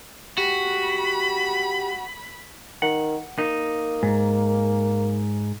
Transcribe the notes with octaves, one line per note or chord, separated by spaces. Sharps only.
F#4 G4 B5
D#3 F#5
A#3 D#4
G#2